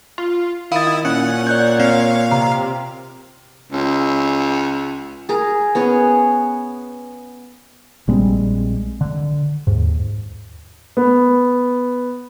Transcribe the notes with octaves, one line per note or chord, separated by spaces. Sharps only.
F4
D#3 E4 F5 D#6 A6
A#2 C#4 F#5
C#5 D5 F#6 G6
C4 F5
C3 A#5
C#2
G#4 A#4 A#5
B3 C#4 G#4 C#5
A#1 G3 G#3 C4
D3
D#2 G#2
B3